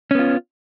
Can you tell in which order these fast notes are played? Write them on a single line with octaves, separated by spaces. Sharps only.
C#4 B3 F4